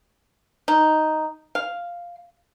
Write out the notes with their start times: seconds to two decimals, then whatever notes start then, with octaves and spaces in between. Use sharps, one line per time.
0.68 D#4
1.55 F5